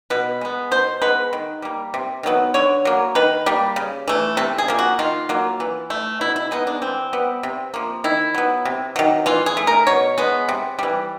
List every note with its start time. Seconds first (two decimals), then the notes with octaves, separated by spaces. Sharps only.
0.10 B2 B4
0.41 G#3 B3
0.71 B2 C5
1.02 G#3 B3 B4
1.33 D#3
1.62 G3 A#3
1.94 C3
2.23 D#3 F#3 B3
2.54 D3 C#5
2.85 F#3 A#3
3.15 D#3 B4
3.46 G3 A#3
3.76 C#3
4.08 E3 A3
4.37 C3 A4
4.58 G#4
4.68 F3 A#3
4.79 F#4
4.99 D#3 F4
5.29 F#3 A#3
5.60 E3
5.90 A3
6.21 B2 E4
6.36 E4
6.51 G#3 B3 D#4
6.67 D4
6.82 E3 C4
7.13 G3 B3
7.43 C3
7.74 F3 A#3
8.04 D#3 E4
8.34 F#3 B3
8.65 C3
8.96 D#3 F#3
9.26 E3 F4
9.46 G#4
9.57 A3
9.67 A#4
9.87 B2 C#5
10.18 G#3 B3
10.49 C3
10.79 E3 G3